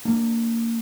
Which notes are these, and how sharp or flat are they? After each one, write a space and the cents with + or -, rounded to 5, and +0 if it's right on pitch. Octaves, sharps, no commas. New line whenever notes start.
A#3 -20 D4 +10